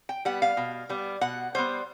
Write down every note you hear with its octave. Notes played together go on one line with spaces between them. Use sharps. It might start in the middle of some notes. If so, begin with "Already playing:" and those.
G5
G3 B3 F#5
F5
B2
G3 B3
B2 F#5
G3 B3 C5